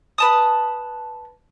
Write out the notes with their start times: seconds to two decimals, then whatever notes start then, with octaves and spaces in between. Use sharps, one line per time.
0.18 B4 A5 D#6